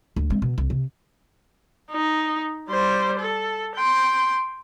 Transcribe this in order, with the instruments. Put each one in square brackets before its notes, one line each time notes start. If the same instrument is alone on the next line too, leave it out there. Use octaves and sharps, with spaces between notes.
[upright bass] D2
G#3 C4
B2
C2
C3
[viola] D#4
G3 C5
A4
G5 C6